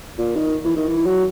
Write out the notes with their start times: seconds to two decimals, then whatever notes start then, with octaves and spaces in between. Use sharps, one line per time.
0.18 A#2
0.36 D#3
0.65 E3
0.76 D#3
0.88 E3
1.05 F#3